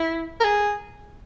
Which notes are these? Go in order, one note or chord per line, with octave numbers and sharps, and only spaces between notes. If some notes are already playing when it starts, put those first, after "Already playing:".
Already playing: E4
A#4
G#4